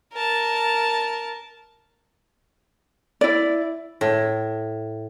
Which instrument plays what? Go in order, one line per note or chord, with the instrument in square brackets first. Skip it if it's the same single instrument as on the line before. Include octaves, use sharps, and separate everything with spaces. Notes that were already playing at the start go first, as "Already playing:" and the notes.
[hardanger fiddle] A#4 A5
[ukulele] E4 D5
[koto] A2